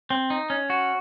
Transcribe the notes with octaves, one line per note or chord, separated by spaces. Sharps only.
C4
D#4
C#4
F#4